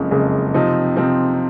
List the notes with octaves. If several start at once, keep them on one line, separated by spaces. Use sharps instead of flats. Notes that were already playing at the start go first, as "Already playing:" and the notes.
Already playing: F#1 F2 C#3 G#3
F#1 F2 C#3 G#3
C3 F3 C4 D#4
C3 F3 C4 D#4